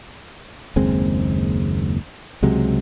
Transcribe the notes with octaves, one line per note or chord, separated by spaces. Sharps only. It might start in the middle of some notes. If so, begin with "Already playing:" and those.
F#1 D#2 G#3 C4
C#2 C3 F#3 G#3